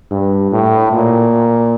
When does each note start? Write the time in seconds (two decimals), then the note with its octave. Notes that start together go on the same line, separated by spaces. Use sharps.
0.11 G2
0.52 A2
0.92 A#2